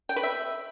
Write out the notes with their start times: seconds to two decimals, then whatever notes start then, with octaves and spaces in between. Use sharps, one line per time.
0.09 G5
0.16 B4
0.23 E5